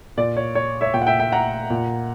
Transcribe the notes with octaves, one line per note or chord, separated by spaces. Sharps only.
A#2 D5
C#5
C#5
C#5 E5
A#2 E5 G5
F#5
E5 G5
E5 G5
F#5 A#5
A#2